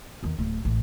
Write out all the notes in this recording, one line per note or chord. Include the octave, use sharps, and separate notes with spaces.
E2 D#3
D1
A1